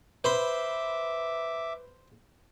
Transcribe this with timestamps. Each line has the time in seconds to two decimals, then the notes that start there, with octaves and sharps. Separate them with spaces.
0.24 B4 C5 E5 B5 C6 D6